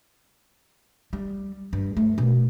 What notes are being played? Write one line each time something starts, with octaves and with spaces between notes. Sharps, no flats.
G3
G2
A3
B2